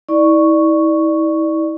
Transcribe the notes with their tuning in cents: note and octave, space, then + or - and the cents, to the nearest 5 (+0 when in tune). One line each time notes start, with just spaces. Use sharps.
E4 -40 D5 +15 C#6 +0